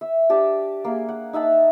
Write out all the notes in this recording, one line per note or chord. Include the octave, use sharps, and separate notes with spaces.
E5
D4 G4 A5
A#3 G#4
F#5
D#4 E5 F#5 A5